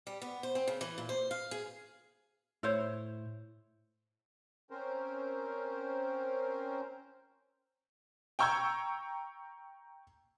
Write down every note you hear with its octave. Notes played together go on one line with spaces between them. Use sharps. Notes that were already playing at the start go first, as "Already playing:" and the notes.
G3
B3
C5
C4
C#3
E3
A#2
C5
F5
G#4
A2 E4 C5 C#5
C4 C#4 A#4 C5
G5 A#5 C#6 E6 G6 G#6